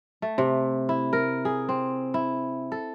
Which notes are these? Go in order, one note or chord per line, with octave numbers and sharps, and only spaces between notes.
A3
C3
E4
A#4
G#4
C4
E4
A4